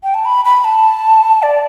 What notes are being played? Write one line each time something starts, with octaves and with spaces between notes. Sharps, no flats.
G5
A5
B5
B5
A5
D5